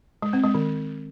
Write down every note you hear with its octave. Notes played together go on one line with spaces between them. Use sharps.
G#3
C4
G#3
D#3